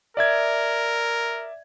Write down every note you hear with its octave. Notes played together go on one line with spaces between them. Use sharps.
A#4 D5 E5 G#6